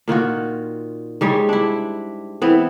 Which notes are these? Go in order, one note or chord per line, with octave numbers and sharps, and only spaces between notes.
A#2 D#3 F4 F#4
G#2 G3 G#3 C#5
D4 E4
E3 B3 C4